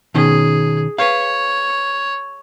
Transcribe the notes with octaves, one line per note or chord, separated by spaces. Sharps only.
B2 D#3 C#4 G#4
B4 C#5 F5